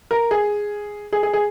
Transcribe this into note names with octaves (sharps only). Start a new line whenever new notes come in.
A#4
G#4
G#4
G#4
G#4